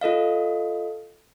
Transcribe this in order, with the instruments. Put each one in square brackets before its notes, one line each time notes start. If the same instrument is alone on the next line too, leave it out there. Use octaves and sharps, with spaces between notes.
[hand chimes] F4 A4 D#5 F5